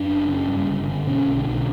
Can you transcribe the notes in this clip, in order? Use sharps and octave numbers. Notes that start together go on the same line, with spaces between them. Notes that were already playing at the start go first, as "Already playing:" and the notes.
Already playing: F#2 D4
F#1
C#3
G2
G1
D3
B2 C#4
B1
D3
B1
D3